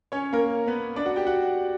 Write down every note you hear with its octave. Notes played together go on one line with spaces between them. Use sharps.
C#4 C#5
A#3 A#4
B3 B4
D4 D5
F#4 F#5
G4 G5
F#4 F#5